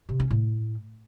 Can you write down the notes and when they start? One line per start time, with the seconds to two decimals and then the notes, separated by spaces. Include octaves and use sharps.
0.09 C3
0.20 C#4
0.31 A2